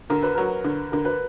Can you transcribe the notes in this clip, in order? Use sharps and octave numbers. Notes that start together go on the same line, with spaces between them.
D3 A#4
B4
F#3 A#4
D3
D3 A#4
B4